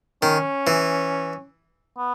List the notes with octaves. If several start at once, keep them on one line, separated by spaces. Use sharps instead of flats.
D#3 C#4
E3
B3